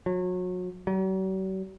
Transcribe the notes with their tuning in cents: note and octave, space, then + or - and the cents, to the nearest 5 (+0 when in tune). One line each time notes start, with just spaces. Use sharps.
F#3 -30
F#3 +45